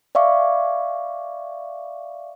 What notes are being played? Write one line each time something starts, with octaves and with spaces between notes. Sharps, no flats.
D5 E5 F5 C#6 D6